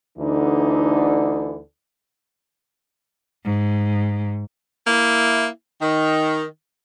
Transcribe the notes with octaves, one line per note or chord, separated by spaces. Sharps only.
D2 D3 E3 D4 D#4
G#2
A#3 E4
D#3